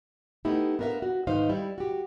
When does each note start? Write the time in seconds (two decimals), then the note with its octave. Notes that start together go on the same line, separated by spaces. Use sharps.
0.45 A3 B3 D#4 E4 G4
0.79 B3 D4 A#4 C#5 E5 F5
1.02 F#4
1.27 G#2 D#3 D#4 B4 C5 F5
1.49 G3 E4
1.78 F#4 G4